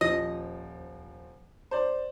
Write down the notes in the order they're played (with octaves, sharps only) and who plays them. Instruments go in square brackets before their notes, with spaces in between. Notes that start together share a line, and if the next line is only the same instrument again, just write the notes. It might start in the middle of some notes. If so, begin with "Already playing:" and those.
[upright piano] D#1 F3 [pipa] D#5
[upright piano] C5 D5